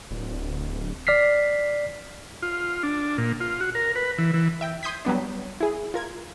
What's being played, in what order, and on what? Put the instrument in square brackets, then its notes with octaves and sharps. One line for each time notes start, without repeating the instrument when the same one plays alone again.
[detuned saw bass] D1
[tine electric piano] D5 F6 B6 C7
[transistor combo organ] F4
D4
A#2
F4
F#4
A#4
B4
E3
E3
[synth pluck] E5 G5
C6 D#6 G6 G#6 B6
F#3 G3 B3 D4
E4 G#4
F4 A#4 G#6